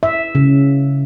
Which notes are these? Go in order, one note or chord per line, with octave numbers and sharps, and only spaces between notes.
E5
C#3